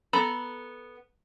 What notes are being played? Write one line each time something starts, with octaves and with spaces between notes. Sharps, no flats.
B3 A4 A#5 B5